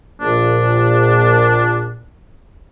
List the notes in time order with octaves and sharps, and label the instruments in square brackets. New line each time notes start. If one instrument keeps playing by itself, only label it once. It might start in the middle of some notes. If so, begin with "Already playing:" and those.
[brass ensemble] A#1 [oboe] D4